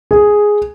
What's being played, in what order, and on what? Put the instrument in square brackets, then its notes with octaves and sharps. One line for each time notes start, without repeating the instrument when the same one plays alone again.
[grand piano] G#4